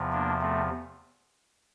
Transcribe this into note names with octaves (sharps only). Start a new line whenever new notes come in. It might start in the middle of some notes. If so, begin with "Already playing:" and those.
Already playing: E2 C3 F3
A#3 D4
A3 C4